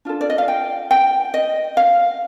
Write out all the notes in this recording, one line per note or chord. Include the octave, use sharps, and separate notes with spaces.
D4 F4 A4
D5
D#5
F5
G5
G5
D#5
F5